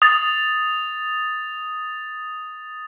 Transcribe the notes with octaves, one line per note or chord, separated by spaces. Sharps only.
D#6 A6